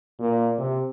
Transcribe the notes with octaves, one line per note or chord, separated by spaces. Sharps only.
A#2
C3